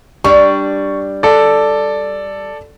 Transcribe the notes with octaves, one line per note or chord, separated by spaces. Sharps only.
G3 D4 C#6
A4 D5